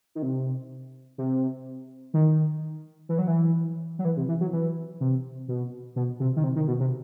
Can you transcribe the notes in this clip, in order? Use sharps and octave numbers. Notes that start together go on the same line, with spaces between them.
D#3
C3
C3
D#3
E3
F#3
E3
F#3
E3
C3
E3
F#3
E3
C3
B2
B2
C3
D#3
C3
D#3
B2
C3